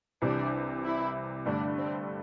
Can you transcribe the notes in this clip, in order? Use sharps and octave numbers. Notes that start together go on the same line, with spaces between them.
C2 C3 E3 D4
E4
G2 D3 A3 D4
C4